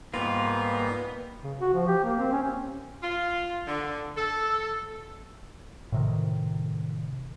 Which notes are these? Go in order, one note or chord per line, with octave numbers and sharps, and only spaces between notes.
G#2 G3 A#3 B3 F4
C#3
F#4
F3
G4
A#3
C4
C#4
F4
D3
A4
A2 C3 D#3